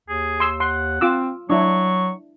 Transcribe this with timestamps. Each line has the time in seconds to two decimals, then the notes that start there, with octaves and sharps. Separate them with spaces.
0.08 D#2 G#4
0.40 C6 E6
0.60 F#5 C6
1.01 C4 F4 D6 E6
1.50 F#3 D4 E4 C#6